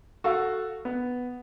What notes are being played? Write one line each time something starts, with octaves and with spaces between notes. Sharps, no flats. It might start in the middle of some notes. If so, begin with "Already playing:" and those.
F#4 A4 F5
B3